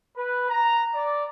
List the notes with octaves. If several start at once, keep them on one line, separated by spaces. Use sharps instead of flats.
B4
A#5
D5